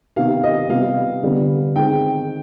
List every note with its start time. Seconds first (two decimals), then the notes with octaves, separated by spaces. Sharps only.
0.16 C3 D#3 B3 F5
0.43 D#5
0.69 C3 G3 B3 F5
1.23 D3 G3 B3
1.76 D#3 G#3 C4 G5